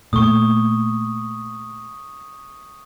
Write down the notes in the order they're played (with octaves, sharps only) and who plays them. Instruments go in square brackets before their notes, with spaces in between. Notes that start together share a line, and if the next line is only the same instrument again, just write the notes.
[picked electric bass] A#2 A3 [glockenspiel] C#6 D#6